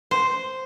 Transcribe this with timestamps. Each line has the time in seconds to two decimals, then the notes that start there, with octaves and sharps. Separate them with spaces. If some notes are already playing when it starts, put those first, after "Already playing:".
0.11 C5